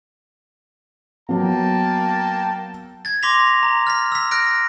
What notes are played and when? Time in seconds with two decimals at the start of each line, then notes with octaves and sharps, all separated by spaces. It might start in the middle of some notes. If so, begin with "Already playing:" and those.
1.29 F#3 A#3 B3 G5 A5
3.05 G#6 A6
3.23 C6 D6 A#6 B6 F7
3.63 A#5
3.87 F6 A6 B6
4.12 E6 B6
4.31 F6 F#6 A#6 D7